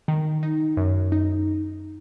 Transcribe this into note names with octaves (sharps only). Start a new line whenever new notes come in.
D#3
D#4
F#2
D#4